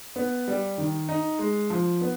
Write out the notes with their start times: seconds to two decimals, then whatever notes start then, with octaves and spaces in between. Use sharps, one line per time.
0.16 B3
0.48 G3
0.78 D#3
1.09 D#4
1.39 G#3
1.70 F3
2.01 B3